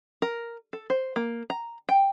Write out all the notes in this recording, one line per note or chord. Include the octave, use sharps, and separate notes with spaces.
A#4
A4
C5
A#3
A#5
G5